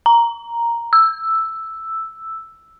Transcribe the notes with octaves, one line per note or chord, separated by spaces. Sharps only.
A#5
E6